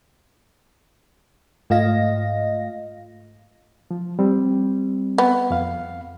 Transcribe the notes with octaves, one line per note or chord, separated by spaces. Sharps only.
G#2 A3 F4 D#5 F5 A#6
F3
G3 C4
B3
F2 F5